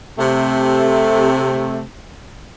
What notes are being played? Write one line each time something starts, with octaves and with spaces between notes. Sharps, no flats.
C3 A3